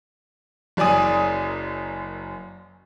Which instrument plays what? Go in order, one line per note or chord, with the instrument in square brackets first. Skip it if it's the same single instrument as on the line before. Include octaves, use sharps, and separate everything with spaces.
[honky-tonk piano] F#1 F#2 D5 G#5 D#6